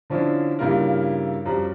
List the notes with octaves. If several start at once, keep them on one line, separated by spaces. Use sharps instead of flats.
D3 F3 C#4 D4 E4
G2 C#3 A#3 E4 F4 A#4
F#2 F3 G3